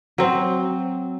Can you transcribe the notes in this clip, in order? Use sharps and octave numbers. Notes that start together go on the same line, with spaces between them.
F#3 C4